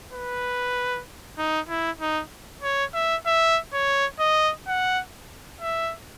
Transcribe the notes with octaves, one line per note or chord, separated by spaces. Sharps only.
B4
D#4
E4
D#4
C#5
E5
E5
C#5
D#5
F#5
E5